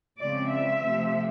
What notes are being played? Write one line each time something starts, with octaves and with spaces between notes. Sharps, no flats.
C#3 F3 G#3 C4 D5
E5
C3 F3 A3 C4